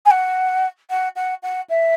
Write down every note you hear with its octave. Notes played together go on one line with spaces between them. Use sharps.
G#5
F#5
F#5
F#5
F#5
E5